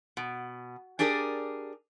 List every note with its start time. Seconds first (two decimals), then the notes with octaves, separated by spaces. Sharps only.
0.17 B2
0.99 D4 G4 G#4 A#4 D5